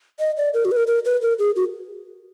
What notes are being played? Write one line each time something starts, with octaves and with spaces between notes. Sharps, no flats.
D#5
D5
A#4
F#4
B4
A#4
A#4
B4
A#4
G#4
F#4